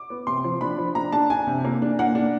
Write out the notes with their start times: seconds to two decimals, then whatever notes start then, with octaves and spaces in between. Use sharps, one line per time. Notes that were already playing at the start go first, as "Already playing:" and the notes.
Already playing: D6
0.10 B3
0.27 C3 C6
0.44 F3
0.61 D4 B5
0.78 F3
0.95 D4 A#5
1.12 D4 A5
1.30 D4 G#5
1.47 C3
1.65 A#3
1.82 D4
1.99 A#3 F#5
2.15 D4